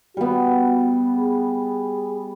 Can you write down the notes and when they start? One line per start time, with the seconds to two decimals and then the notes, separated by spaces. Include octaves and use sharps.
0.17 G3 B3 F#4
1.16 G#4